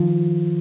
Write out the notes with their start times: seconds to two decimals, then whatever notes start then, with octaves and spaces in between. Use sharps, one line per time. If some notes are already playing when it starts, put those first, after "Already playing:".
Already playing: D#3 F3 F4